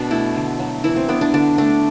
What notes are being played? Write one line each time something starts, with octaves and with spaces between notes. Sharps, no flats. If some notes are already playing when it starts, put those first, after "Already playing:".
Already playing: B2 D4
A3 E4
D3
F#3
E3 E4
C4
B3 D4
D4
D3 D4
A3 D4